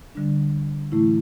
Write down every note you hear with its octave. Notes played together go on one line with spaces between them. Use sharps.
D3 G3 D4
A2 E3 A3 E4